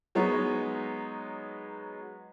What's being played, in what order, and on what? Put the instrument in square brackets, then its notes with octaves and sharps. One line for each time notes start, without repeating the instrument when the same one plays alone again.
[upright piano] F#3 G#3 B3 D#4 C#5